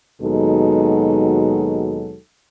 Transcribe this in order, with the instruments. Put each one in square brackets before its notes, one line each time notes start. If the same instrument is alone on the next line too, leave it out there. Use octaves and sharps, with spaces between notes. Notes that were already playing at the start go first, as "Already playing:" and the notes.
[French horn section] D#2 B2 F#3 G#3 D#4 A4